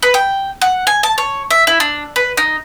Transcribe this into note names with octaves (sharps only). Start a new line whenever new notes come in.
B4
G5
F#5
G#5
A5
C#5
E5
E4
D4
B4
D#4